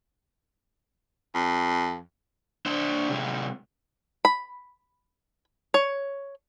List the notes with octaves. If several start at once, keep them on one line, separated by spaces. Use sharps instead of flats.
F2
D4 C5
C3 G#3
B5
C#5